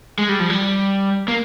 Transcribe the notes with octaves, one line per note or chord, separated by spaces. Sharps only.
G#3
G3
F3
G3
A#3